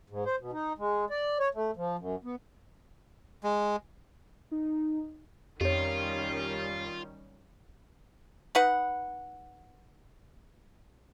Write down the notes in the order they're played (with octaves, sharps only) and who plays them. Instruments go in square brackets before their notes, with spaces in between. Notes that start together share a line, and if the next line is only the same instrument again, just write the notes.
[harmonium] G#2
C5
B2
D#4
G#3
D5
C#5
A3
F3
F#2
B3
[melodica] G#3
[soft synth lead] D#4
[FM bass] F2 [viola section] D#3 G3 C#4 [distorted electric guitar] F4 [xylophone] G4 C#5
[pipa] D#4 B4 F#5